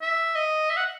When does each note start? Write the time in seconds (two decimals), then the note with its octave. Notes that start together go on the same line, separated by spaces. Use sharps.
0.02 E5
0.35 D#5
0.70 E5
0.77 F#5